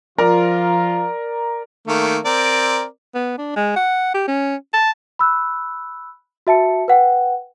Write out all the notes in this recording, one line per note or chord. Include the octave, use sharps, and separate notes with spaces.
F3 F4 A#4 D5 A#5
D#3 A3 A#3
C4 A#4 D5
B3
D4
G#3
F#5
G4
C#4
A5
B5 E6 F#6
F#4 E5 A5 C#7
B4 F#5 G5